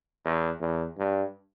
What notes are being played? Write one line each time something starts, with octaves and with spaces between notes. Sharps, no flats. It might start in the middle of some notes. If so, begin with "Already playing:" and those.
E2
E2
G2